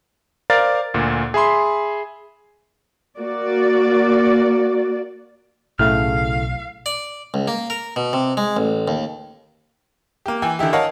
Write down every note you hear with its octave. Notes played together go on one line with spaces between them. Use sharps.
A#4 C5 D5 F5 A6
D2 A#2
G#4 E5 B5 C6
A#3 F#4 D5
B1 A2 C#3 A3 F5 F6
D5
C#2
A#3
A#4
B2
C3
G#3
A1
D#2
A#3 G4
E3 G5 G#5
D3 D#3 E4 G4
A#4 C#5 D#5 F5 F#5 A5